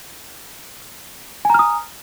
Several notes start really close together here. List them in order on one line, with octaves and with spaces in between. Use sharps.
G#5 A#5 F6 D#6